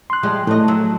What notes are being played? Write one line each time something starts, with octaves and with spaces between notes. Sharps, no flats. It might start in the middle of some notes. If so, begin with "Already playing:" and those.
C6 F#6
F3 G3 G#3
A2 A3 D#5
F#3